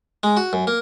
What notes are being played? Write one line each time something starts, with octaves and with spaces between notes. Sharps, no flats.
G#3
F#4
F#2
A#3